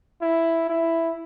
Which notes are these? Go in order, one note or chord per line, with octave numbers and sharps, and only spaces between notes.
E4
E4